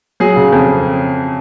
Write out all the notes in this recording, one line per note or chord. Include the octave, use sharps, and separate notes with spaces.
F#3 G#4
C#3
F2